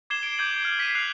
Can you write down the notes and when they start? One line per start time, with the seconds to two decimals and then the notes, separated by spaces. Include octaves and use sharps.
0.10 D6 G#6 C7 E7 G7
0.23 D7
0.38 D6 G6 G#6 D#7 F#7
0.63 D6 F6 C7
0.79 D6 B6 C7 D7 D#7
0.95 F6 F#6 C7 F7